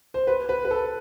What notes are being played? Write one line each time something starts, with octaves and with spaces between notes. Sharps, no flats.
C5
B4
B4
B4
A4